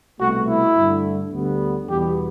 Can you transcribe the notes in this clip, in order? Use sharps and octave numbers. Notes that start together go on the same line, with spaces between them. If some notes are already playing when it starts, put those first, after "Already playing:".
C2 B2 A3 F#4
E4
G2 D3 A3
D2 D3 G3 B3
E2 B2 G3 B3 G4